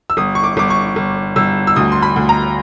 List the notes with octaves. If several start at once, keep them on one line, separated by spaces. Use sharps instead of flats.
E6
G1 D#6
C#6
D6
G1 D6
C#6
G1
G1 E6
E6
D2 D#6
C6
B5
D2
A#5